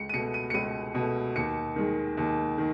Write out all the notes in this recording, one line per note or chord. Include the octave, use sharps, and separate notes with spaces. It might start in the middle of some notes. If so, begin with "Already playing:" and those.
Already playing: C#2 C#7
D#7
B2 A3 C#7
D#7
C#7
C#2 D#7
B2 A3
D#2 C#7
D#3 G#3
D#2
D#3